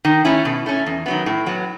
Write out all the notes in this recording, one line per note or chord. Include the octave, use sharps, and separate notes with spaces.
D#3
A3 C#4 E4
B2
A3 C#4
E2
D#3 F#3 B3
A2
F#3 B3